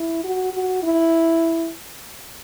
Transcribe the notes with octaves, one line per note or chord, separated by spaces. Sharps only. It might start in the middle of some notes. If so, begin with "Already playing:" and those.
Already playing: E4
F#4
F#4
E4